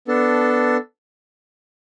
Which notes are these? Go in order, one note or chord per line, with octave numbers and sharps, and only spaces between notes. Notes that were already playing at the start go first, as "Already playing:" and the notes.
B3 D4 A4